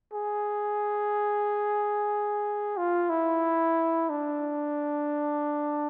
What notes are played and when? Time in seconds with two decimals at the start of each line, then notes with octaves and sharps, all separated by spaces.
0.13 G#4
2.77 F4
3.10 E4
4.10 D4